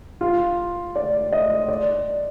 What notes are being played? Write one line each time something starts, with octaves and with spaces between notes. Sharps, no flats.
F4
D5
D#5
D5